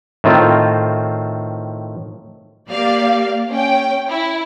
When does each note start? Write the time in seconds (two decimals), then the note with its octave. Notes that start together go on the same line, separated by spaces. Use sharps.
0.24 A2 D#3 C4 F4
2.70 A#3 G4 D5 F5
3.49 C#4 G5
4.09 E4